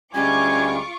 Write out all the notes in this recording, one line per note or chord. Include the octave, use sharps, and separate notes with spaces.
D2 G3 G#3 C#4 F4 G#5 C#6 D6